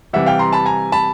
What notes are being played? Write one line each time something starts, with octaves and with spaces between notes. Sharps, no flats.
C3 E3 G3 E5 F#5
F5 G5
A#5 C6
A5 B5
G#5 A#5
A5 B5